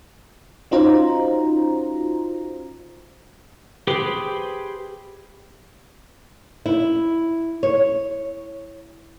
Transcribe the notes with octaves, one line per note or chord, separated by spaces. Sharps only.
C#4 D#4 F4 F#4 C5 A#5
G4 G#4 B4 C5 G5
E4
C#5